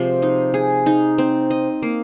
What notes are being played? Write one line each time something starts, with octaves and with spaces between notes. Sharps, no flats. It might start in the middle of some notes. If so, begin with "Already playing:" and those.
Already playing: C3 F3 G#3
D#4
G#4
D#4
C4
D#5
A#3